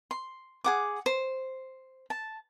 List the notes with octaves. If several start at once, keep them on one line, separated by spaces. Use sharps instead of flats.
C6
G#4 F#5 D6
C5
A5